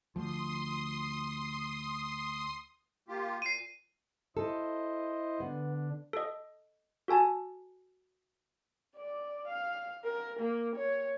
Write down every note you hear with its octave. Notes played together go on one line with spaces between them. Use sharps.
D2 F3 C6 D#6
A#3 F4 G4
A#2 C7 D#7
E4 A4 C5 D#5
D3 B3 D4
A4 D#5
F#4 A4 G#5 A5
D5
F5
A#4
A#3
C#5